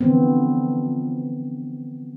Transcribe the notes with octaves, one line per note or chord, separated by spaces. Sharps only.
D3 E3 F3 B3 C4